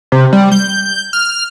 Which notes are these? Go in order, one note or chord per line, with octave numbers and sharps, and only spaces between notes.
C3
G3
G6
F6